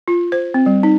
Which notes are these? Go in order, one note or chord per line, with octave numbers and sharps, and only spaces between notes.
F4
C5
C4
G3
D#4